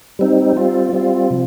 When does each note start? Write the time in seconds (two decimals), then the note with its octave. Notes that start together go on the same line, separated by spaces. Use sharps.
0.19 G3 C4 D#4
0.57 G3 C4 F4
0.93 G3 C4 F4
1.30 C3 F3